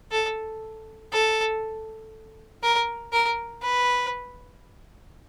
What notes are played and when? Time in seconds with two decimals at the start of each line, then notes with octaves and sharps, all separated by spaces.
0.11 A4
1.12 A4
2.63 A#4
3.12 A#4
3.62 B4